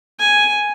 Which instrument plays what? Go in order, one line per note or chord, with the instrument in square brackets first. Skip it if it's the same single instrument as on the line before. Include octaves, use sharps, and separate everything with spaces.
[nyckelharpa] G#5